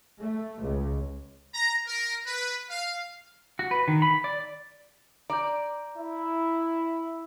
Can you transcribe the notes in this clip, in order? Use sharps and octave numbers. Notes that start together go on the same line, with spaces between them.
A3
C#2
A#5
A#4
B4
F5
F#4
B4
D#3
B5
D5
D5 A#5 G6
E4